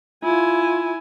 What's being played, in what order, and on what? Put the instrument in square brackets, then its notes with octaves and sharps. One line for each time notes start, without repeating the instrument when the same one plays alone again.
[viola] E4 G#5 [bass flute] F4